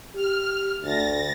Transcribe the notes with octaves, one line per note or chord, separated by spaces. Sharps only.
G4 F6
D2 A6 A#6